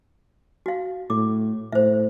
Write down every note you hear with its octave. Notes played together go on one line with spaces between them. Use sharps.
F#4 F5
A2 D6
A2 C5 E5